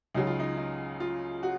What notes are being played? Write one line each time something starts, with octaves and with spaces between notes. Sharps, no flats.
C#2 C#3 F#3 D#4
F4
D#4
D#4
F4
F#4